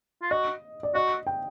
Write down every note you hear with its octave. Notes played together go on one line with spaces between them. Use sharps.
F4
F#4 D#5
D5
F#4 D#5
G5